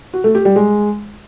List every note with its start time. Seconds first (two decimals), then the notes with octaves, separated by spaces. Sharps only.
0.13 F#4
0.24 A3
0.35 G4
0.45 G3
0.56 G#3